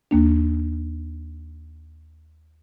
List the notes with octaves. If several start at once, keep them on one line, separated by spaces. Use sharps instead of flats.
D#2 A#3 D4